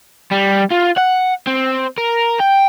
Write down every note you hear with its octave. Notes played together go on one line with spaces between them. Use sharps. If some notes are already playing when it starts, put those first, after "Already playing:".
G3
F4
F#5
C4
A#4
G5